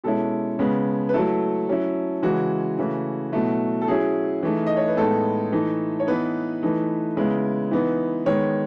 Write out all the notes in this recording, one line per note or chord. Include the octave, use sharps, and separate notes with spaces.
B2 G#3 C#4 E4 A4
C#3 G#3 B3
B4
F#3 A3 E4 A4
F#3 C#4 E4
C#3 E3 G#3 F#4
C#3 E3 A3
B2 F#3 A3 E4
A4
F#3 C#4 E4 G#4
E3 A3 D#4
D#5
C#5
B4
A2 G#3 B3 D#4 A4
E3 A3 D#4
C#5
E3 B3 D#4 B4
E3 A3 D#4
C#3 G#3 B3 E4
E3 B3 D#4
D#3 G#3 B3 C#5